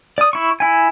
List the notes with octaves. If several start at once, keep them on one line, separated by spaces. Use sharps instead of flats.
D5 D#6
E4 C#6
E4 G#5